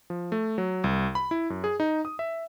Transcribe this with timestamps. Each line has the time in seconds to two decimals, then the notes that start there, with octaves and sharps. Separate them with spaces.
0.10 F3
0.32 A3
0.58 F#3
0.84 C2
1.15 B5
1.31 E4
1.50 F#2
1.64 G#4
1.80 D#4
2.05 D#6
2.19 E5